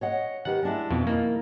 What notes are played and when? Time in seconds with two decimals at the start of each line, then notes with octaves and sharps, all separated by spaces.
0.01 C#5 D#5 F#5
0.45 D#3 G4 B4 F#5
0.63 G#3 D4 E4
0.90 F2 B2
1.07 D#3 A#3 E4